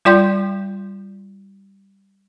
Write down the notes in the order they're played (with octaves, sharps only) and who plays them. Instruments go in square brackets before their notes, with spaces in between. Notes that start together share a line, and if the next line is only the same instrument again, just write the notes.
[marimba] G3 F4 D5 G5 C6 G6